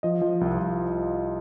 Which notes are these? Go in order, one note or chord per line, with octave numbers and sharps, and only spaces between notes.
F3 D#5
F3
C2
C2